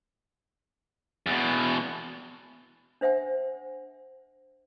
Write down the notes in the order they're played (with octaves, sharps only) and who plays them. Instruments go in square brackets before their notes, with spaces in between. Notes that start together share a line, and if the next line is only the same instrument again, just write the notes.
[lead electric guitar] E2 B2
[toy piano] D4 C5 E5 F#5 G#5